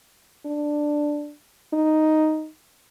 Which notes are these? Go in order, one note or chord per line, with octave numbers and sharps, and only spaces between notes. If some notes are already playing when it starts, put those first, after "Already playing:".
D4
D#4